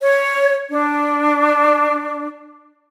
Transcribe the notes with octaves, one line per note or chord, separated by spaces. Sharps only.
C#5
D4